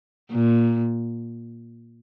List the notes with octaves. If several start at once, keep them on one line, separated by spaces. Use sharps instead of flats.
A#2